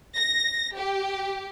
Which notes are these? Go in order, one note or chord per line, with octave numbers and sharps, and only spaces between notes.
A#6
G4